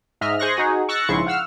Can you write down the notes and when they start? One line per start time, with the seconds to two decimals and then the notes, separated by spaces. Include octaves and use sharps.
0.21 G#2 D#5 E5 F6
0.39 G#4 C5 C6 C#6 F#6 A#6
0.57 D#4 F#4 G#4
0.89 C#6 E6 F#6 A6 A#6 C#7
1.08 A#1 G#2 C#3 E4 C6 C#6
1.26 F5 F#5 E6 F6